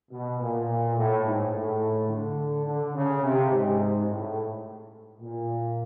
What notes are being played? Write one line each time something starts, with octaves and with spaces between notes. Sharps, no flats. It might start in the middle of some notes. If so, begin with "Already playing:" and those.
B2
A#2
A2
G#2
A2
D3
D3
C#3
C3
G#2
A2
A#2